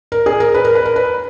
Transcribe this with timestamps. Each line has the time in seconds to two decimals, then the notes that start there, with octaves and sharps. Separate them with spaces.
0.12 A#4
0.26 G#4
0.40 A#4
0.54 B4
0.65 A#4
0.75 B4
0.85 A#4
0.96 B4